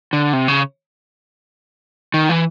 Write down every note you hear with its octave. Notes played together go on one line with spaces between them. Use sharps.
D3
C3
C#3
D#3
E3